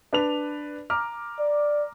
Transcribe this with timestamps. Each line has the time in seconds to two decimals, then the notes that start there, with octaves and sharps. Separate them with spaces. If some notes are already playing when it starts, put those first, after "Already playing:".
0.13 D4 B4 F7
0.90 A#5 D6 F6
1.39 D5